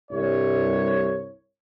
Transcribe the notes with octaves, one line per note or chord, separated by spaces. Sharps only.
C2 G2 C#5